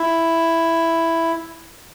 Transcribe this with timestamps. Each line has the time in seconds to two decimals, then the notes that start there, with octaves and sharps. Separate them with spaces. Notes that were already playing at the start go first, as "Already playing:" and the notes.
Already playing: E4